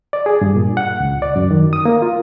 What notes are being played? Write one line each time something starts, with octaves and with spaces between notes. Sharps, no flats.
D5
G#4
G2
A#2
F#5
C#2
D5
F#2
D#3
D#6
A#3
F4